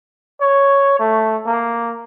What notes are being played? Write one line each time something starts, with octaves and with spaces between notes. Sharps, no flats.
C#5
A3
A#3